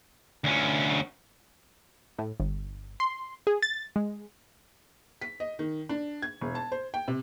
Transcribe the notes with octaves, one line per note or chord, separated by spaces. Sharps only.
D2 C#4
A2
G1
C6
G#4
A6
G#3
B6
D#5
D#3
D4
G#6
E1
A5
C5
G5
C3